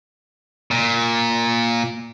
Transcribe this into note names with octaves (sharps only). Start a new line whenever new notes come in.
A#2